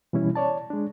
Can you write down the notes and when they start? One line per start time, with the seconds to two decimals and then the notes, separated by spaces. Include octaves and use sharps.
0.13 B2 E3 G3 C#4 E4
0.36 C#5 D5 A5
0.70 G#3 D4